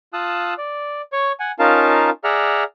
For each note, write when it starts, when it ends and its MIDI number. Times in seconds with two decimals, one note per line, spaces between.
0.13 0.54 65
0.13 0.54 77
0.13 0.54 81
0.13 0.54 87
0.13 0.54 88
0.13 0.54 90
0.58 1.02 74
1.13 1.32 73
1.13 1.32 85
1.40 1.52 78
1.40 1.52 80
1.59 2.10 61
1.59 2.10 63
1.59 2.10 65
1.59 2.10 70
1.59 2.10 77
1.59 2.10 81
2.24 2.64 68
2.24 2.64 74
2.24 2.64 76
2.24 2.64 78
2.24 2.64 82
2.24 2.64 89